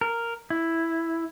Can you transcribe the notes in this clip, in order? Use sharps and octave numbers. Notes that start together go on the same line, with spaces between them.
A#4
E4